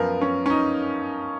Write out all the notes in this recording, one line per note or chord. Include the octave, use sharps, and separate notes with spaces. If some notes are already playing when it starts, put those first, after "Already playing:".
Already playing: F#2 F3 B3 A#4
C#4
C#4
D#4